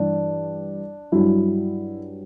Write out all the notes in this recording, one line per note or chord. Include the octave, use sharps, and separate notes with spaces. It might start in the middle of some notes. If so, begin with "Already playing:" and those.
Already playing: G2 E3 D4
G2 F#3 E4